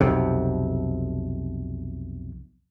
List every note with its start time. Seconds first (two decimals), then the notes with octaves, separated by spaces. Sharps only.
0.01 B1 F2 C3